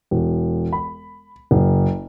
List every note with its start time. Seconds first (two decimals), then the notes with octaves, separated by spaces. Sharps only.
0.11 E1
0.73 B5
1.51 F#1